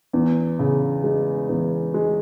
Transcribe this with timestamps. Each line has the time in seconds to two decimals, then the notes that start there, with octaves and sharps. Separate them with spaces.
0.13 E2
0.59 C#3
1.04 G#3
1.49 E2
1.94 G#3